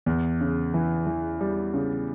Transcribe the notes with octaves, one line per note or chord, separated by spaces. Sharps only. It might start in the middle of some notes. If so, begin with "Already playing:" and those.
E2
C#3
E3
E3
G3
C#3